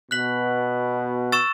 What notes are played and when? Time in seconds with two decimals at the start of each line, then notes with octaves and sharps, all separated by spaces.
0.11 B2 F#6 B6 F#7
1.32 C#6 E6 A6 E7